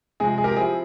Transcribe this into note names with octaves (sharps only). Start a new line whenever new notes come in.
C3 F3 G#3 G#4
G#4
G4 A#4
F3 C4 E4 G#4